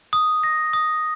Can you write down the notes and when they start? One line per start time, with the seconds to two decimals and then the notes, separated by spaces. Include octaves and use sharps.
0.13 D#6
0.43 A#6
0.73 D#6